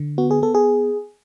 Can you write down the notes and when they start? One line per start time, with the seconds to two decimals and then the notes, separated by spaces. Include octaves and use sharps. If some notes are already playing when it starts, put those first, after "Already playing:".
Already playing: D3
0.18 B3 F#4
0.31 G#4
0.42 B3 A4
0.55 G#4